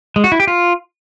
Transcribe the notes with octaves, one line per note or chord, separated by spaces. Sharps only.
G#3
F#4
E4
G4
F4